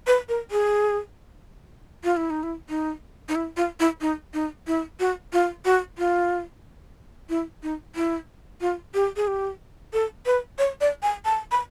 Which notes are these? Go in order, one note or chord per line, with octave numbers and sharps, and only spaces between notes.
B4
A#4
G#4
F4
E4
D#4
E4
D#4
D#4
E4
F4
E4
D#4
D#4
E4
F#4
F4
F#4
F4
E4
D#4
E4
F4
G4
G#4
G4
A4
B4
C#5
D5
G#5
A5
B5